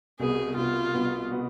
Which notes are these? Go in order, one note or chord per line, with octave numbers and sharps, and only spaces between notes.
C2 B2 B3 G#4
C2 B2 B3 F4
C2 B2 B3
B2 B3